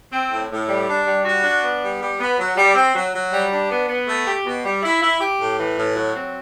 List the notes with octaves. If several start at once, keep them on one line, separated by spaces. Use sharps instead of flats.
C4
A2
A2
G3
D4
G3
F#4
D4
B3
G3
G3
B3
F#3
G3
C4
F#3
F#3
G3
D4
B3
B3
A3
G4
B2
G3
E4
E4
G4
A2
E3
A2
F#3
C4